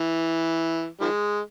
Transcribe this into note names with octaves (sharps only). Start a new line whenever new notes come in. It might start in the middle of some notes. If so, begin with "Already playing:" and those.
Already playing: E3
D#3 F3 G#3